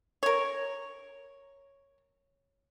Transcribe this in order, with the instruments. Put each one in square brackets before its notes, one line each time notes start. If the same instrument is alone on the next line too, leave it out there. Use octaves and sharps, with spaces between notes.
[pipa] A#4 C#5